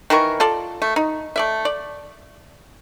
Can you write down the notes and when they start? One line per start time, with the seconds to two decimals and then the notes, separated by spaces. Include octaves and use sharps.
0.10 D#3 E3 A#4 C#6
0.40 F4 A4 D5
0.82 A3
0.96 D#4
1.36 A3 D5 E5
1.65 D5